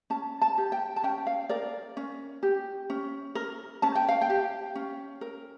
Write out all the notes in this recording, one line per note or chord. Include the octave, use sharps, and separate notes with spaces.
C#4 A5
A5
G4
G5
A5
C#4 G5
F5
A#4 D5
C#4
G4
C#4
A#4
C#4 A5
G5
F5
G5
G4
C#4
A#4